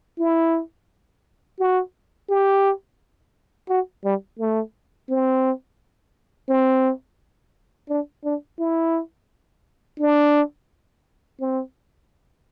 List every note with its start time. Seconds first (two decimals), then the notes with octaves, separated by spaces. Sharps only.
0.19 E4
1.60 F#4
2.29 G4
3.69 F#4
4.04 G3
4.39 A3
5.09 C4
6.49 C4
7.89 D4
8.24 D4
8.59 E4
10.00 D4
11.40 C4